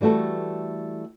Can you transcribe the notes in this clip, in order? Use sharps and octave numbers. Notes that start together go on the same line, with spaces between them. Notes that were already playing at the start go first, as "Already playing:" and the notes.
E3 G3 A3 F#4 A4